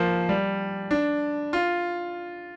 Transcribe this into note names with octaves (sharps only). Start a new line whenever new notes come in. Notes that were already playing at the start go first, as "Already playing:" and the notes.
Already playing: F3 A#3
G3
D4
F4